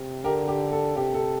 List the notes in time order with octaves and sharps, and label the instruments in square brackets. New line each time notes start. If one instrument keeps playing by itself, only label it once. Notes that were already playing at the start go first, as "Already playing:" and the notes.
Already playing: [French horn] C3
[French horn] D3 [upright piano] G4 A#4
[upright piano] G4
A4
[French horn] C3 [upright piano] G4
[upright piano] A4